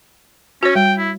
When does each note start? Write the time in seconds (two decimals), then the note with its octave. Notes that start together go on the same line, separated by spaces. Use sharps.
0.63 C#4 F#4 C#5
0.75 G3 G5
0.99 E4